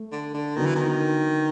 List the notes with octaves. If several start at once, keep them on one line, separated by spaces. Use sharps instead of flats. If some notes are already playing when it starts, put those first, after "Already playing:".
Already playing: A3
D3
D3
D3 D#3 F#3 B3
E3
D#3